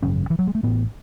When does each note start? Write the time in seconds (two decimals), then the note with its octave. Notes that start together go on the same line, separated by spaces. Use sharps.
0.02 G#1 F#2 C#3 C#4
0.30 E3
0.39 F#3
0.47 G#3
0.55 A3
0.63 A1 A2 B3